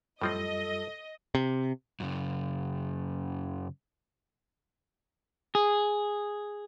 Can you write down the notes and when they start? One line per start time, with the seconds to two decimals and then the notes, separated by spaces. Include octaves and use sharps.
0.22 F#2 A2 F3 G3 C4 F4 A4 D#5
1.35 C3
2.00 F#2 C#3
5.55 G#4